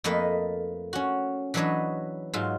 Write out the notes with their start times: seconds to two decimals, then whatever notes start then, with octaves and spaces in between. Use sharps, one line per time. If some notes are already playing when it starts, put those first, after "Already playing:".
0.04 F2 A3 A#3 B4 D#5
0.93 C#4 F#4
1.54 E3 F#3 D4 B4 C#5 D#5
2.33 G#2 F#3 F4